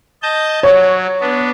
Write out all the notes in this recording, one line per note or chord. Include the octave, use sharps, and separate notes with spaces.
D#5 A5 G6
F#3 C#5
B3 D4